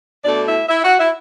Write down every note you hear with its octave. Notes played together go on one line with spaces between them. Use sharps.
B2 A3 D4 D5
E4 E5
E4 E5
F#4 F#5
E4 E5